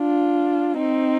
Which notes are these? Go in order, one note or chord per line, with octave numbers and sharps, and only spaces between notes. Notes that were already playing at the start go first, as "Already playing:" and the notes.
Already playing: D4 F4
C4 D#4